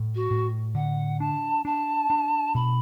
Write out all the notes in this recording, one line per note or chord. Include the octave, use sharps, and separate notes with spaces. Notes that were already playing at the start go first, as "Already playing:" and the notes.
Already playing: A2
F#4
A2
D3 F#5
D4 A5
D4 A5
D4
B2 B5